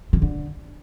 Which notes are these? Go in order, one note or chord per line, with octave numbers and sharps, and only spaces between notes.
C#3
D3